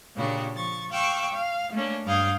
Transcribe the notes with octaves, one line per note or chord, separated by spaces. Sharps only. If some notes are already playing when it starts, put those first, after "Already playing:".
A#2 C#3 D4 F#4 G4
F3 C#6 A6
F5 G5 C#6 D6 E6 F#6
F5
A3 A#3 C#4 D4
G2 D5 F5 D#6 G6 G#6